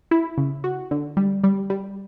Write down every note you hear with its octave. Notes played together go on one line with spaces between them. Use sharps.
E4
C#3
F#4
D3
G3
G3
G3